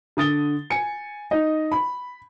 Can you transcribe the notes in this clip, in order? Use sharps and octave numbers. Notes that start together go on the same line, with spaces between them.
D3 D#6 A6 G7
G#5 C#7
D#4 D#5
B5